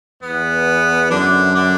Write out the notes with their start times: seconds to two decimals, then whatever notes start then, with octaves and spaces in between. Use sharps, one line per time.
0.23 E2 B3
1.10 F#2 D3 D4
1.55 D3 D4